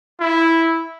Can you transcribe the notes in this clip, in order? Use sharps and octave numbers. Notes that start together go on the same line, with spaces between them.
E4